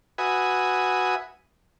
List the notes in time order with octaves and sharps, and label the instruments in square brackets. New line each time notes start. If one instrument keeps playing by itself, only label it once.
[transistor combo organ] F#4 B4 E5 G#5 D#6